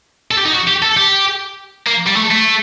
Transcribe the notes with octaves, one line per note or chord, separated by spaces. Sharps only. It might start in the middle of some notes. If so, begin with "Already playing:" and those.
A4
G4
D#4
F#4
G4
A4
G4
A#3
G3
A3
A3